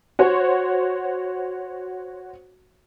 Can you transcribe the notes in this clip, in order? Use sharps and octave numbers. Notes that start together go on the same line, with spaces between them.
F#4 C5 C#5